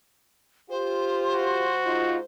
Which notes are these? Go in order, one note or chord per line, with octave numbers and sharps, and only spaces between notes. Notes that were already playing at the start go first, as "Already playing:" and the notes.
F4 G4 C5
F#4
G#2 D#4 F4